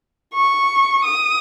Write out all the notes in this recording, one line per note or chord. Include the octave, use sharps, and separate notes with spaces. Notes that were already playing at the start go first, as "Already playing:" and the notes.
C#6
D#6